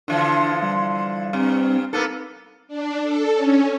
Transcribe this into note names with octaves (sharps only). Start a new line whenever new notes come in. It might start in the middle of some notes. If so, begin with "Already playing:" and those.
D3 E3 F3 D4 C6
G3
G2 C4
A#3 B3 D#4 A4
D4
A4
C#4